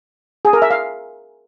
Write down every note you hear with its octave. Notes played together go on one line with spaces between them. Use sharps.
G#4
A#4
E5
F5